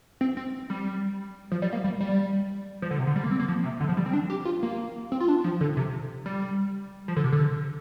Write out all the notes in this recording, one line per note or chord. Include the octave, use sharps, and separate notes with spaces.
C4
C4
G3
F3
G3
A#3
G3
G3
F3
D3
C3
D3
G3
A#3
C4
A#3
F3
C3
D3
F3
G3
C4
D4
G4
F4
A#3
C4
F4
D4
F3
D3
C3
G3
F3
D3
C3
D3